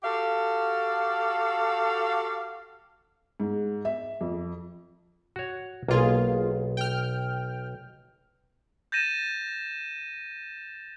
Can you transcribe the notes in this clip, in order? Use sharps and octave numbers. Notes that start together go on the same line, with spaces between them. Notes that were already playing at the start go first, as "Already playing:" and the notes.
F#4 G4 A4 F5
G#2
E5
F2
F#4 C#5
B1 A#3 F4 G#4
G5 F6
G6 A6 A#6 D#7 E7